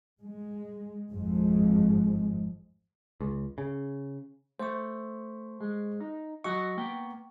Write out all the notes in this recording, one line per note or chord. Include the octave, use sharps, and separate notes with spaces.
G#3
G#1 F2 G#3
C#2
C#3
A3 C5 C#6
G#3
D#4
F#3 F#4 D#5 C#6
A#3 B3 G5